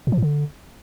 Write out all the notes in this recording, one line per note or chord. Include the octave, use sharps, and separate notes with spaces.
A#2
F3
A2
D3